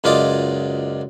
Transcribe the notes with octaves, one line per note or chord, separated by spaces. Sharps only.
C#2 F#2 F4 D5 D#5 D6